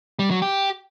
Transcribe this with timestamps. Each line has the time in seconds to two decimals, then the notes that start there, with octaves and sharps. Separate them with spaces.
0.19 G3
0.31 F#3
0.42 G4